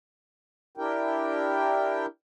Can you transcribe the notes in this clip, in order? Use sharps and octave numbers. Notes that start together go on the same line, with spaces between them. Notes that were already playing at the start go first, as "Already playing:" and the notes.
D4 E4 G4 A#4 G5